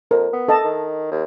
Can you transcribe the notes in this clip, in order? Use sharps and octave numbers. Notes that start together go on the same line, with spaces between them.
F2 A#4
B3
A4 D#5 A5
D#3
D#2